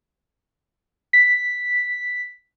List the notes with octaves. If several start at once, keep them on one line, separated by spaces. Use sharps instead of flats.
B6